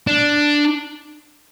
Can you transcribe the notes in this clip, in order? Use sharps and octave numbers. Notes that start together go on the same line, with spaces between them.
D4